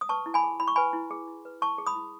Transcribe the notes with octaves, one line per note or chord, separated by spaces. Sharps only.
D#6
B4 A5 C#6
E4
G#5 B5
G#4
E4 B5
C#6
B4 G#5 B5
E4
G#4
E4
B4
E4 A5 C#6
G#4
B5 D#6
E4